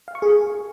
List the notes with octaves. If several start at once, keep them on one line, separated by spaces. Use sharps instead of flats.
F5
C#6
G#4